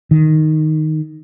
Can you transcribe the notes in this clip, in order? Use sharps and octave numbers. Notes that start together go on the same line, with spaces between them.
D#3